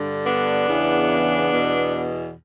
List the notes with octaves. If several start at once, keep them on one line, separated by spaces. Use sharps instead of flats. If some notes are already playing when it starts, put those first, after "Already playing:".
Already playing: G2 D3
B3 D4
E2 C#3 E3
E2 B2